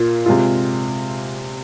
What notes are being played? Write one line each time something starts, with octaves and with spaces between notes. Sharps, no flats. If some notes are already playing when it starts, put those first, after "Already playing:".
Already playing: A#2 A#3 F4
C3 G#3 F4